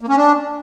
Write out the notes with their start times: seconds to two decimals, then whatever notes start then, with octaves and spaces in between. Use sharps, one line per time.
0.01 A#3
0.09 C#4
0.17 D4